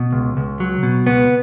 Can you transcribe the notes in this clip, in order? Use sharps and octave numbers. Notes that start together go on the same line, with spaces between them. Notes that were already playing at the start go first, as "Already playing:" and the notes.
Already playing: B2
C#2
C#2
F#3
B2
C#2 B3